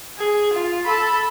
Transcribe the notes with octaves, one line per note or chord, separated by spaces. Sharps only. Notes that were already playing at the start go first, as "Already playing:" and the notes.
G#4
F4
A4 B5